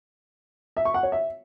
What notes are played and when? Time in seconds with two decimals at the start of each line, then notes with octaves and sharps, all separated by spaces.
0.77 E5
0.85 C#6
0.94 F#5
1.03 C#5
1.12 E5